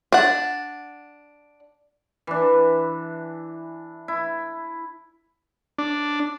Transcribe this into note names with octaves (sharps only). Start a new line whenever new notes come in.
D4 F#5
E3 D4
E4
D4